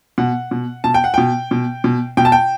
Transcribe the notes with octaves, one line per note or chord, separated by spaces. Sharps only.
B2 F#5
B2
B2 A5
G5
F#5
B2 G5
B2
B2
B2 G5
A5
G5